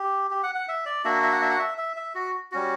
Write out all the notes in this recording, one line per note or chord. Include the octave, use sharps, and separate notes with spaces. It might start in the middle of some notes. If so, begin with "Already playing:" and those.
Already playing: G4
G4
F#5
F#5
E5
D5
A#3 D4 F#4 E5
E5
F#5
E5
F#5
E5
E5
E5
F#4
G3 C#4 F#4